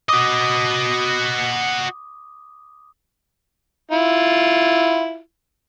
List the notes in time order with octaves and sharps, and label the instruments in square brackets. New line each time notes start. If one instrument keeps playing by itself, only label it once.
[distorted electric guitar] F#4 D#5 [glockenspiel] D6 D#6
[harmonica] E4 F4